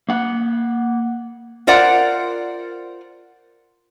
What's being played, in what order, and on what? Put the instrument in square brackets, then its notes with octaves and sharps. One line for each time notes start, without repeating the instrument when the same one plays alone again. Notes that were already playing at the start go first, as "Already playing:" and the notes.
[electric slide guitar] A#3 F#5
[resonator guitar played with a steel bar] F4 A#4 C5 D5 F#5